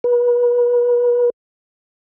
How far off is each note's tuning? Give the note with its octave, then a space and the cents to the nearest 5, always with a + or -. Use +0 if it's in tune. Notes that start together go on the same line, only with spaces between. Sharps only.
B4 -35